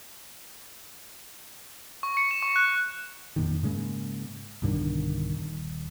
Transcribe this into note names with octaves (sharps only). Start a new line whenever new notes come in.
C#6
C#7
E7
C#6
F#6
F2 A#2 D#3
G#2 C#3 G#3 A#3
B1 G2 D3 D#3
D#1